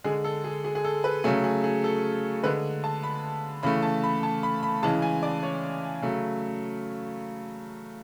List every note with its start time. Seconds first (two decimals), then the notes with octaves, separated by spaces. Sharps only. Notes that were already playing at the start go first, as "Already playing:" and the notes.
0.04 D3 G#3 G#4
0.24 A4
0.44 G#4
0.64 G#4
0.75 G#4
0.84 A4
1.04 B4
1.24 C#3 F#3 A3 G#4
1.44 G#4
1.64 G#4
1.84 A4
2.44 D3 G#3 B4
2.84 A5
3.03 B5
3.63 C#3 E3 A3 B5
3.83 A5
4.03 B5
4.23 A5
4.43 B5
4.63 B5
4.83 C#3 E3 G#3 A5
5.02 G#5
5.23 D5
5.43 C#5
6.02 C#3 F#3 A3